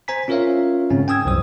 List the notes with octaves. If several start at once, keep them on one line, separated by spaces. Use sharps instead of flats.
C5 G#5 A#5 B6
C#4 F4 A#4 C#5 E5 F5
G#2 C#3 C4 C#4
G5 G#5 D#6 E6 G#6
C2 F#2 E3 C5 D#6